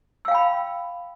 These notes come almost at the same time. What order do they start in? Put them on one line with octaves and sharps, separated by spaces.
E6 F5 G5 B5